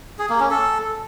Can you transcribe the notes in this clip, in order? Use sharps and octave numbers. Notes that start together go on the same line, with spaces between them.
G#4
A#3
C#4
A4